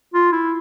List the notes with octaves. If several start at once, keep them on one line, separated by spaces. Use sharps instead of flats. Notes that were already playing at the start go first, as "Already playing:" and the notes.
F4
E4